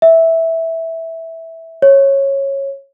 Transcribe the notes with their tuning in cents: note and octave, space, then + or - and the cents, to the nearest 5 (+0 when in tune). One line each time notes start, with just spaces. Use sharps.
E5 -10
C#5 -15